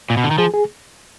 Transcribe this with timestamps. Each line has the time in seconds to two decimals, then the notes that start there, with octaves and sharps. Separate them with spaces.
0.10 A#2
0.17 B2
0.24 D3
0.31 D#3
0.38 F3 G#4
0.54 G#4